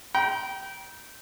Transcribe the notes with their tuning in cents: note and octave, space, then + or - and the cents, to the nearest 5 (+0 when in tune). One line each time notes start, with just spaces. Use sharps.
G5 -20 A#5 +35